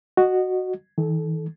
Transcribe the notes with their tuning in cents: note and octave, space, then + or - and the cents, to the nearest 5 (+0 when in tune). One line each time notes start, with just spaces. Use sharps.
F#4 +0 D#5 -20
D#3 +45 A4 -20